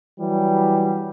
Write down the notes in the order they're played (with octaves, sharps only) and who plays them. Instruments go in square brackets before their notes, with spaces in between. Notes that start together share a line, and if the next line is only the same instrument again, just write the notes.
[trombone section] E3 F#3 G3